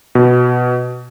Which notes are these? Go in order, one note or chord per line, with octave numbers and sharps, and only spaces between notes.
B2